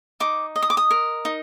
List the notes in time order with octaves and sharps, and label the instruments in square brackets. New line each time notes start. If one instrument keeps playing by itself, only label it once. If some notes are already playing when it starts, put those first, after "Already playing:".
[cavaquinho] D#4 D6
D#5
D#6
D6
D#6
A#4
D#4